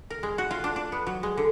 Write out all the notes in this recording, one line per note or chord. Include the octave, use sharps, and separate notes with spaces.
A#4
G#3
F#4
F4
D4
D4
B3
F#3
G#3
D3